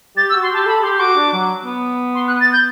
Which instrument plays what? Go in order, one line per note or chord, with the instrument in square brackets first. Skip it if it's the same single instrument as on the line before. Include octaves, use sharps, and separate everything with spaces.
[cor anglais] G4 [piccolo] A6
[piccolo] E6
[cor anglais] F#4
[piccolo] C6
[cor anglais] G4 [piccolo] A5
[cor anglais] A4 [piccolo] B5
[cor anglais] G4 [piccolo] C6
[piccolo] C6
[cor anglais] F#4 [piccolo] D6
[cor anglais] D4
F#3
B3
[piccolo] C6
F#6
A6
G6